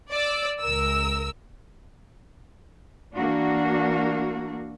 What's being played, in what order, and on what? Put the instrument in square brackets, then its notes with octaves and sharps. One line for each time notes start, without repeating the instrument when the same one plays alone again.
[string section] D5 E6
C#2 A#4 E6
[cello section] E3 A#3 D4 F#4